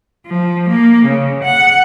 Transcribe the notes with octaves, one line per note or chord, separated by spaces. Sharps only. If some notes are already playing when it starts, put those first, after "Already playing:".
F3
A#3
C#3
F#5